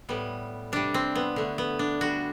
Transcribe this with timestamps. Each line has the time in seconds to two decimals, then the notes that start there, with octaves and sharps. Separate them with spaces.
0.09 A2 G3 B3
0.72 C3 G3 D4
0.94 C4
1.15 B3
1.36 D3 A3
1.58 B3
1.79 D4
2.01 D3 G3 F#4